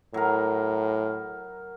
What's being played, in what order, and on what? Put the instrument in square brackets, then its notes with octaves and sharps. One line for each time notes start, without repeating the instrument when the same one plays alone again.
[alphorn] A2 [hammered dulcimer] F#3 A#4